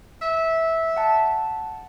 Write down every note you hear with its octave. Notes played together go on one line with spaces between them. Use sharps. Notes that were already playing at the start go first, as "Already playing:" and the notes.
E5
F#5 A5